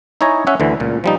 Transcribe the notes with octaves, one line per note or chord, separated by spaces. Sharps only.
D#4 E4 C#5 G#5 A#5
C#4 E5 F#5
D2 D3 E3
C#2 A#2
F3 G3 D#4